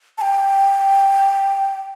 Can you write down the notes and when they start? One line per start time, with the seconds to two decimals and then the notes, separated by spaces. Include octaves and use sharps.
0.18 A5
0.21 G5